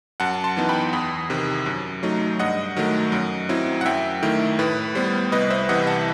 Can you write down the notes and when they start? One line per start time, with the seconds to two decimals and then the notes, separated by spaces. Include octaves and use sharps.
0.20 F#2 F#5 A5
0.44 A5 C6
0.57 E3 B3 D#4
0.69 G5 B5
0.93 E2 B5 D#6
1.30 C3 D#3
1.66 F#2
2.03 F#3 A3 D#4
2.39 G2 D#5 F#5
2.77 D#3 F#3 A3
3.12 F#2
3.49 F#3 C4 E4
3.81 F#5
3.86 F#2 E5 G5
4.22 D#3 A3 E4
4.59 A2 B4
4.95 G3 B3 C5
5.32 C2 B4 D#5
5.50 C5 E5
5.69 C3 E3 D#5 F#5
5.87 F#5 A5